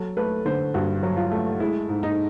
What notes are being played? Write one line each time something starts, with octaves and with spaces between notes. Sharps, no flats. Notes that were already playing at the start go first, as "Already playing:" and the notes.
Already playing: F#3 A4
A3 B4
D3 C5
G2 F#4
F#3
F4
A3
G#3 E4
G#2
D#4